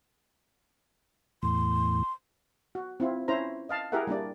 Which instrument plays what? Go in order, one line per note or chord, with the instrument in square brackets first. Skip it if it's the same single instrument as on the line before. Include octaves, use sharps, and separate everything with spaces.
[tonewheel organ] E2 A2 [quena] C6
[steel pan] F#4
C4 E4 F4
C#4 E4 C5 A#5
D#5 F5 A5
E4 G4 G#4 A#4 E5 F#5
G3 A#3 D4 D5